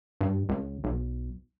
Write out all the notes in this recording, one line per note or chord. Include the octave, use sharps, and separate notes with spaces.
G2
C#2
B1